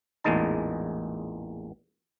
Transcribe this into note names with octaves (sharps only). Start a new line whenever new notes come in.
A1 E2 A#2 G#3 D#4 A5